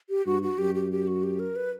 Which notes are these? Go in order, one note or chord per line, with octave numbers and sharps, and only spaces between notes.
G4
G2 F#4
F#4
F#2 G4
G4
G4
F#4
G4
A#4
B4